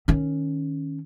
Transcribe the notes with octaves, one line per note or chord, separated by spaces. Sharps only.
D#3 C#4